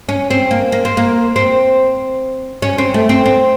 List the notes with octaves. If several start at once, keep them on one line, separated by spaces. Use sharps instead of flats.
C#4
C4
A#3
A#3
C4
A#3
C4
C#4
C4
A3
C4
C4